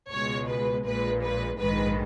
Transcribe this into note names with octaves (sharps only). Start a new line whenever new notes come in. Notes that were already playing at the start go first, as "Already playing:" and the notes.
C#2 B2 G#3 C#5
B4
A#1 A#2 G#3 B4
B4
A#1 G#2 D#3 G#3 B4